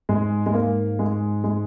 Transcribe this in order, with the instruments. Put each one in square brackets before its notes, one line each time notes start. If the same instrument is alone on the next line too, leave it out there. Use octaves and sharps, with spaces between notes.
[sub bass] G#2 [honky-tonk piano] G#3
[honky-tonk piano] G#3
A#3
G#3
G#3